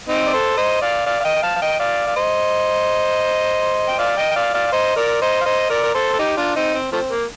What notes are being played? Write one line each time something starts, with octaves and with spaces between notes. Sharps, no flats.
C4 D#4
D5
A4 C5
C5 D#5
D5 F5
D5 F5
F5
D#5 G5
G5
F5 A5
F5
D#5 G5
D5 F5
F5
C5 D#5
G5
D5 F5
D#5 G5
G5
D5 F5
D5 F5
F5
C5 D#5
A#4 D5
C5 D#5
F5
C5 D#5
A#4 D5
A#4
A4 C5
A4
D#4 G4
D4 F4
C4 D#4
C4
F3 A3 C4
A#3